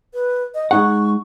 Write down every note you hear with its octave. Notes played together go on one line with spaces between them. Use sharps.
B4
D#5
G#3 D#4 F#5 C#6